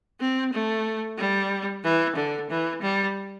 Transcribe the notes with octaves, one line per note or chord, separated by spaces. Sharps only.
C4
A3
G3
E3
D3
E3
G3